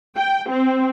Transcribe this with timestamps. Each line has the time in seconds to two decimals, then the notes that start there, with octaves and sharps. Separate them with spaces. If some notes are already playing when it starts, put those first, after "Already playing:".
0.15 G5
0.48 C4